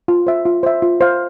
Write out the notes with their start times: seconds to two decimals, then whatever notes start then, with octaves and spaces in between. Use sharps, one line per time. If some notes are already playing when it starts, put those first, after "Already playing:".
0.08 F4
0.27 C5 E5
0.46 F4
0.63 C5 E5
0.82 F4
1.01 C5 F5 C6